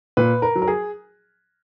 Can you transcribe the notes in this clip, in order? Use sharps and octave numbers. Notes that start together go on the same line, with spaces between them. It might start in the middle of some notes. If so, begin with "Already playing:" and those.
A#2 B4
A#4
F#3
A#4
G#4